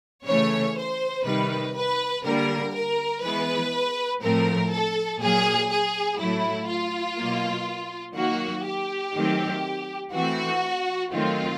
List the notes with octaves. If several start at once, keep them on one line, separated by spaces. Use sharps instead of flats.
C#3 E3 A3 C#5
C5
C3 D#3 G3 B4
B4
D3 G3 A#3 A#4
A#4
E3 G#3 B3 B4
A2 F3 A3 C4 A#4
A4
A#2 F#3 A#3 G#4
G#4
A2 F#3 A3 E4
F4
B2 F#3 A#3
D#3 F#3 A#3 F#4
G4
D#3 F#3 A3 C4
E3 A3 C4 F#4
D#3 F#3 A3 C4 F4